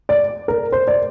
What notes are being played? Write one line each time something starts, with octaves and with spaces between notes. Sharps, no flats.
D5
A#4
C5
D5